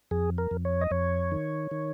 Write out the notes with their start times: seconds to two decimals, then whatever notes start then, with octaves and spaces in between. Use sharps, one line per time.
0.11 F2 G#4
0.38 A#4
0.51 F2
0.65 C#5
0.81 D#5
0.91 F2 C#5
1.32 D#3
1.71 D#3